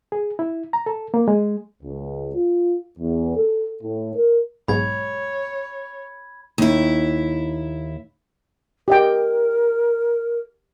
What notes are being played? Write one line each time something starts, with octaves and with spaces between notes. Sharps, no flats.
G#4
E4
A#5
A4
A#3
G#3
C#2
F4
E2
A4
A2
A#4
B1 G#2 C#5 B5 G#6
D#2 E4
G4 A#4 D#5 G5